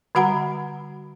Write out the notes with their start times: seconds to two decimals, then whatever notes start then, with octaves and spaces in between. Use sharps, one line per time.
0.15 D3 G3 F#4 F#5 A#5 B5